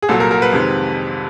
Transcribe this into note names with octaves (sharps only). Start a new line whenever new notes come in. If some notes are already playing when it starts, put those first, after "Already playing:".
G#4
C2 A#2 F#3 A4
A#4
A#4
B4
F2 C3 D#3 G#3